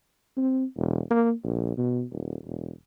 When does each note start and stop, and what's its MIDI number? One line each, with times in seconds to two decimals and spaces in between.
0.37 0.65 60
0.76 1.01 28
1.11 1.33 58
1.44 1.78 34
1.78 2.03 47
2.12 2.36 27
2.46 2.71 28